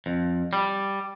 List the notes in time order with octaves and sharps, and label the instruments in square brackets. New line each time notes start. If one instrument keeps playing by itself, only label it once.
[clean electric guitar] F2
G3